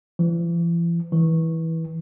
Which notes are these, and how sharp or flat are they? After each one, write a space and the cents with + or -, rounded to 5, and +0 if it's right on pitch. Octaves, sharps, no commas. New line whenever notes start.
E3 +45
E3 -20